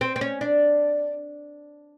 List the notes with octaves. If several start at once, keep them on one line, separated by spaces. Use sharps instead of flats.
C4
C4
C#4
D4